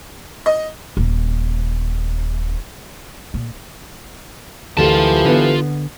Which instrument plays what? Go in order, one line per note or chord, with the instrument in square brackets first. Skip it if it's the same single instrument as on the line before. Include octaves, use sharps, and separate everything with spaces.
[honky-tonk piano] D#5
[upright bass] D#1
A#2
[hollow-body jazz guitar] D2 [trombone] E3 [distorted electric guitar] F4 A5 [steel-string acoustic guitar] G4 A4 A#4
[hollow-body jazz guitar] D3 B3